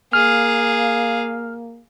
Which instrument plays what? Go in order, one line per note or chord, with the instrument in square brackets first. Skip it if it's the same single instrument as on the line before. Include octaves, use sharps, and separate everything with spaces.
[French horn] A#3 [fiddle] G#4 F5 [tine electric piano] F6